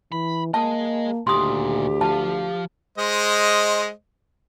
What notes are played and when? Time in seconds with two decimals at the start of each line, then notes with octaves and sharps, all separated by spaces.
0.12 E3 B5
0.54 A#3 G#4 D#5 A5
1.27 D2 A#2 D#3 G4 C6 D#6
2.01 F3 F5 A5
2.98 G#3 C5 D#5